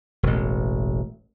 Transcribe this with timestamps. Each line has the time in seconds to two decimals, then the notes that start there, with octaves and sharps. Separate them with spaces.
0.23 E1 A1